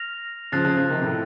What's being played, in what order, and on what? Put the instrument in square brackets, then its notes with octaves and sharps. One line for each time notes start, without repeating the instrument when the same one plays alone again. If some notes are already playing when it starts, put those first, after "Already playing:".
Already playing: [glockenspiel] F6 A#6 F7
[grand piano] C#3 F3 [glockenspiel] F#6 A6 C7
[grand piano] C#3 F3
C#3 F3
C3 D#3
A2 C3